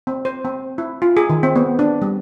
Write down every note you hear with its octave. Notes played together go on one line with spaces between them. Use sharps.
C4
C5
C4
E4
F4
G#4
D#3
C4
B3
D4
G3